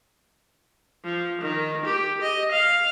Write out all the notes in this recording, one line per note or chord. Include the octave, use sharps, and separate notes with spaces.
F3
D#3
G4
D#5
F5